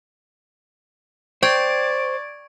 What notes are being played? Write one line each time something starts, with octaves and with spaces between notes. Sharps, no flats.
C5 D5 G5 C#6 G#6 D7